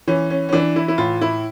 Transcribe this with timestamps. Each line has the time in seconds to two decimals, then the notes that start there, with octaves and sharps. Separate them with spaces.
0.08 E3 C#4
0.30 C#4
0.49 C#4
0.53 E3 D4
0.76 E4
0.88 E4
0.98 A2 F4
1.21 E4